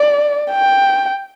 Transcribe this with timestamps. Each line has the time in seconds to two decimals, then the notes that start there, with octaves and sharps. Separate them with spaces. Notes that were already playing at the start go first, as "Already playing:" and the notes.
Already playing: D5
0.52 G5